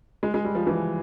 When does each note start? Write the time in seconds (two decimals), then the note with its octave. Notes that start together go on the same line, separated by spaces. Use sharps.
0.23 G#3
0.34 G#3
0.45 G3
0.55 F3
0.67 E3